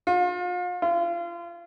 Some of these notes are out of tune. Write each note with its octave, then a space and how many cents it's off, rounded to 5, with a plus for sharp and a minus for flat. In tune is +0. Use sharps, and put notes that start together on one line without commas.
F4 +40
F4 -30